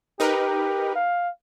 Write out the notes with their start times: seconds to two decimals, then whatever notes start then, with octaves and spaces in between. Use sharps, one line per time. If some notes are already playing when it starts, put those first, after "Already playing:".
0.20 D#4 G4 A#4 B4
0.96 F5